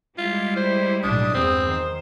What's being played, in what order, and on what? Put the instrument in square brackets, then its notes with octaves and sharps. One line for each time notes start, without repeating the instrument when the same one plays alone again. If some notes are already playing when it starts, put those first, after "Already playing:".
[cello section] G3 G#3 E4 [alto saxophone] F4
[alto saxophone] C5
[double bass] B1 A2 [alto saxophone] D4 [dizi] D#6
[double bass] E2 G2 [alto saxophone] C4
[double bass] D#3 [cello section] C5